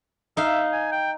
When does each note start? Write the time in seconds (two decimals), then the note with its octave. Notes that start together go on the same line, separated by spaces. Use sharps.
0.37 D#4 E5 F5
0.72 G#5
0.92 G5